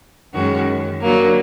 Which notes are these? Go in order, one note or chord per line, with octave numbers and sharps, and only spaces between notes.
F#2 D#3 G#3 C#4 F#4
D3 F#3 A#3